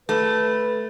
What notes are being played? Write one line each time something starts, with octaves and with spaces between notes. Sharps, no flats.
A3 B4